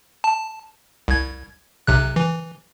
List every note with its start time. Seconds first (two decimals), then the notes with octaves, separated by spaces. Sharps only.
0.24 A5
1.08 C2 G#6
1.87 B1 C3 F#6
2.16 E3